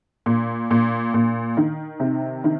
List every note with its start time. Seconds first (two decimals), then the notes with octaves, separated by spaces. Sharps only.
0.26 A#2
0.71 A#2
1.14 A#2
1.57 D#3
2.00 C3
2.44 D#3